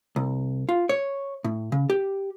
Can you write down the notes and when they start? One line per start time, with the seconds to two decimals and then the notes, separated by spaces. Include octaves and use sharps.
0.16 C2
0.69 F4
0.89 C#5
1.44 A2
1.72 C#3
1.90 G4